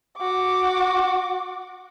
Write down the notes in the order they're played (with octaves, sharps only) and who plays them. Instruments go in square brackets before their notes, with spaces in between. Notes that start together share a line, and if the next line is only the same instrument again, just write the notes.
[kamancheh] F#4 D6